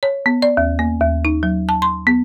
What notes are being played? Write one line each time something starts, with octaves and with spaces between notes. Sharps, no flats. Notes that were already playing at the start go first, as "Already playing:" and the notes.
C#5
B3
D5
D#2
A#3
D#2
D#4
F#3
A5
C6
B3